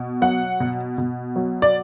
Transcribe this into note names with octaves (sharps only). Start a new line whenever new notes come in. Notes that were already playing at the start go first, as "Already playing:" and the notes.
Already playing: B2
F#3 F#5
B2
B2
F#3
D5